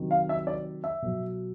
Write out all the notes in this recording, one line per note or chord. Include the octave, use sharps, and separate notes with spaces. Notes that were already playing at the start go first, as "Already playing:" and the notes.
Already playing: C3 D#3 F#3
F5
E5
D5
E5
B2 F#3